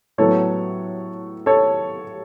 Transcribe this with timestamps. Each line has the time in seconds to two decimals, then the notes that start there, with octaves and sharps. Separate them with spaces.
0.18 A2 F#3 B3 A4 C#5
1.46 A4 C#5